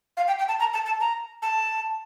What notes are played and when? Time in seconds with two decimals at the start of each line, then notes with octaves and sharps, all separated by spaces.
0.17 F5
0.27 G5
0.39 G5
0.48 A5
0.60 A#5
0.73 A5
0.86 A5
1.00 A#5
1.42 A5